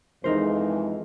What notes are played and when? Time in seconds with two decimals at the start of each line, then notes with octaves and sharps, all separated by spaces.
0.24 F2 E3 G#3 D#4 A#4 C5